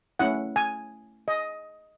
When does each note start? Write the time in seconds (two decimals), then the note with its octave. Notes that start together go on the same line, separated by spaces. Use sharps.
0.19 A3 C#4 E4 F#5
0.56 G#5
1.28 D#5